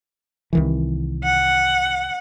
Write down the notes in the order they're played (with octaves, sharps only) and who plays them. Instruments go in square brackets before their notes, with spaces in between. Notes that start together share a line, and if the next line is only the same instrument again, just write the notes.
[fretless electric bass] C2 D#3 E3
[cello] F#5